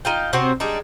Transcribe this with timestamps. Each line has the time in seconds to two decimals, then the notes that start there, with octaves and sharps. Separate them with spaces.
0.05 D#4 F4 G5
0.33 C3 C4 F#4 C#5
0.60 G3 G#3 D4 D#4